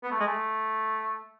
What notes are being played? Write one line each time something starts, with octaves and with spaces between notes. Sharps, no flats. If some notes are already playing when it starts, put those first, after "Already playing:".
B3
A3
G#3
A3